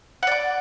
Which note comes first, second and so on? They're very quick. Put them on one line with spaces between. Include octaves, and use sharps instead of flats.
F#5 D5 D6